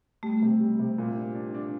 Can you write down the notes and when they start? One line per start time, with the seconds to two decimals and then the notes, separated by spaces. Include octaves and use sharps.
0.23 G3 A3
0.42 C3
0.61 G3
0.79 C3
0.98 A#2
1.17 D4
1.35 D4
1.54 D4